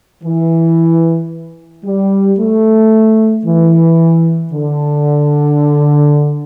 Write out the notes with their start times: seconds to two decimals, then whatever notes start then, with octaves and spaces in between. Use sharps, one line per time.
0.23 E3
1.85 G3
2.39 A3
3.45 E3
4.52 D3